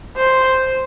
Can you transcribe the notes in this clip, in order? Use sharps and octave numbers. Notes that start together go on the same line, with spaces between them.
C5